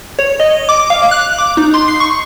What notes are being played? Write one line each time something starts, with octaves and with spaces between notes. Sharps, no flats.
C#5
D#5
D6
F5
F#6
D6
D#4
C6
C7
C#6